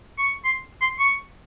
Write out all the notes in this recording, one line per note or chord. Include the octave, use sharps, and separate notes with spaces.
C#6
C6
C6
C#6